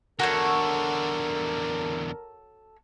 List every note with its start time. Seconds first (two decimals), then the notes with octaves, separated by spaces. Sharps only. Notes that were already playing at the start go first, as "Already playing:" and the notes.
0.20 E2 D3 F#4 A4 A#4 C#5